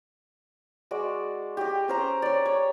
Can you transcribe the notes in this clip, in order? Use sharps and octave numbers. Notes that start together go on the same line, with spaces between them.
G#3 F#4 D5
G4 D#5
C#4 C5 A#5
C#5 D5
C#5